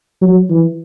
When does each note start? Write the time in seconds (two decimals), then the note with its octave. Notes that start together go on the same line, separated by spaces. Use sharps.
0.22 F#3
0.50 E3